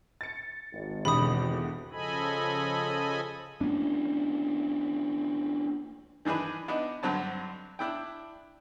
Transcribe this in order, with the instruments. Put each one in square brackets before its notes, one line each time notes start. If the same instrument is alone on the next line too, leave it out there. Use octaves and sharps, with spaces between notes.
[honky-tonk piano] A6 C#7
[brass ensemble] G#1
[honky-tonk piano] E2 D3 G4 [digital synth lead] B2 [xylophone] B5 D#6
[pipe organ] C#3 F3 A4 D#5 G#5 B5
[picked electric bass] A#3 B3 C#4 D4
[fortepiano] D#3 E3 D4 G#4 B4
B3 D4 D#4
G2 D3 F#3 C4 A5
D4 E4 G5